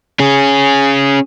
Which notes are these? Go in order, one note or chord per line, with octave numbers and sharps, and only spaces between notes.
C#4 G#4